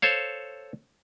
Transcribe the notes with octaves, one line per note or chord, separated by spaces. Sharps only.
A4 C5 C#5 F5